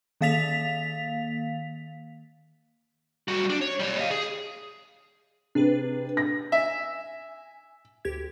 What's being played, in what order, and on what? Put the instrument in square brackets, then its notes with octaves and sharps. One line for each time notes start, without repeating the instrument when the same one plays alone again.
[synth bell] D#3 A#3 F5 A6 B6 F7
[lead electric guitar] G3 F#4
D4
C#5
G3 C#5
D#5 F5
G#4
[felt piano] C3 [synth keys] D4 G#4 B4
[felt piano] A#6
[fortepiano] E5 [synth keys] G#5
[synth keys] D2 G4 G#6